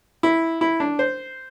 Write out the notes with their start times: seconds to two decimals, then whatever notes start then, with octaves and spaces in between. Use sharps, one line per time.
0.23 E4
0.61 E4
0.80 D4
0.99 C5